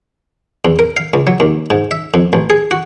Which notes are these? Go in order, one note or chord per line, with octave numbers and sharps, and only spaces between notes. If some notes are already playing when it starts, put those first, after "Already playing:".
E2
A#4
F5
C#2
F#3
D#2
G#2
E5
F2
A1
G#4
F#4